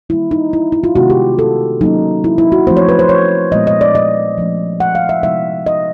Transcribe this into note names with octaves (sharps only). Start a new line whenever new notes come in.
D#3 G3 A#3 E4
D#4
E4
E4
F4
C3 D#3 G#3 B3 F#4
G4
A4
F#3 A#3 C#4 D#4
E4
E4
F#4
F3 A3 C4 C5
C#5
B4
C5
C#5
A#2 F3 G#3 B3 D#5
D#5
D5
D#5
F3 A3 C#4
F#5
F5
E5
C3 F3 G#3 B3 D#4 E5
D#5